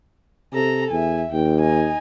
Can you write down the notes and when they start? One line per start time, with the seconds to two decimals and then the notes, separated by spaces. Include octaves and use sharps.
0.54 C3 A4 A#5
0.91 E2 E5 G#5
1.31 D#2 G5
1.61 D#4 G#5